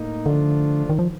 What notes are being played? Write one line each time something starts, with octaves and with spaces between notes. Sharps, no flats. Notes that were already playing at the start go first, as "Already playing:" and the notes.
Already playing: A2 A#3 D#4
D3 F3 A3 D4 F4
D#3
F3